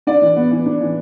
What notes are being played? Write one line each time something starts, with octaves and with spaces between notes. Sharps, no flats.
D4 D5
E3
B3
E3
D4
E3